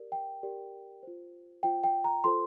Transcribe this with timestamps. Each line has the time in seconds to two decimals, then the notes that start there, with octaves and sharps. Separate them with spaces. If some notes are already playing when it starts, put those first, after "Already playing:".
Already playing: G4 A#4 D5
0.12 G5
0.43 G4 A#4 D5
1.03 F4 C5
1.63 F4 C5 G5
1.84 G5
2.04 A#5
2.24 F4 A4 C5 C6